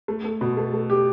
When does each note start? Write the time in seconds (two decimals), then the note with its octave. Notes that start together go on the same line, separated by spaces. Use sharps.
0.08 A3
0.25 A3
0.41 B2
0.57 A3
0.73 A3
0.90 G4